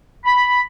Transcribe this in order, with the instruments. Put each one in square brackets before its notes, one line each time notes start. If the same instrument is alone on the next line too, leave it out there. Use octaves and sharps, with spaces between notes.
[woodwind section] B5